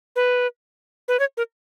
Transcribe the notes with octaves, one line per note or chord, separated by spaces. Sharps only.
B4
B4
C#5
A#4